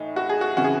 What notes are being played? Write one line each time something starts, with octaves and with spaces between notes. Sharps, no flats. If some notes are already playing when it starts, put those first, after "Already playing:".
Already playing: A2 E3 D#4
F#4
G#4
F#4
C#3 E3 F#4
G#4